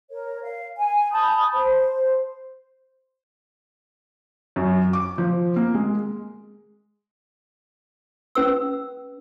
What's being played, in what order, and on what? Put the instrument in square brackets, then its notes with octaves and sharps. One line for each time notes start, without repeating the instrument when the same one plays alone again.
[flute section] A#4 C#5
F5
G#5
A5 B5 D#6 G6
C5
[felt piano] F#2
D6
F3
A#3
G#3
[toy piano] C#4 B4 E6